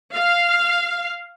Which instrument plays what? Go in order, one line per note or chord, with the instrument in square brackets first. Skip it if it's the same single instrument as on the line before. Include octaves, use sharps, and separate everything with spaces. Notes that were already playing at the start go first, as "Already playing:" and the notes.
[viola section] F5